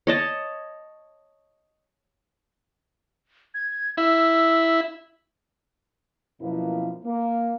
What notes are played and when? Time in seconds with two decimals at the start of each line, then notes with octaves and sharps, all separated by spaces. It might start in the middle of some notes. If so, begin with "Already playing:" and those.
0.07 C#5 D#5 A5
3.54 G#6
3.97 E4 E6
6.41 F#2 B2 F3 A#3 B3 E4
7.04 A#3